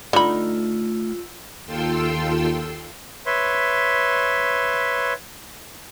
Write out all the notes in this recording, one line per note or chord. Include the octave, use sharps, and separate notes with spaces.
D3 A3 D#4 F4 B5 E6
D#2 F4 A4 G5 C6 E6
B4 C#5 E5 C6